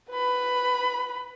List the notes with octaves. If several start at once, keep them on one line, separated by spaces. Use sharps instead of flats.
B4 B5